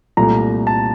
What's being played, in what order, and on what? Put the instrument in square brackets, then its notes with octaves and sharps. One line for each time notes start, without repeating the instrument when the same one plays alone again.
[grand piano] C2 A#2 A3 A#5
A5